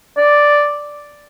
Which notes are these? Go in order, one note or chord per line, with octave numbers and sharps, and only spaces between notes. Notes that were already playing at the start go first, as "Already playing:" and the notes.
D5